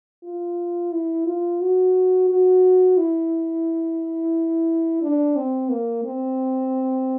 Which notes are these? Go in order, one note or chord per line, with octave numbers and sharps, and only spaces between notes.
F4
E4
F4
F#4
F#4
E4
D4
C4
A#3
C4